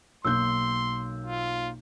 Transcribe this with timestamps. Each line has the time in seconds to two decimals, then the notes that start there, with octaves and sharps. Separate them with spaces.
0.25 B1 A#3 C6 E6 G6
1.26 F4